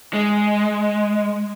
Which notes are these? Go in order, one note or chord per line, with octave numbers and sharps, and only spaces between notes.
G#3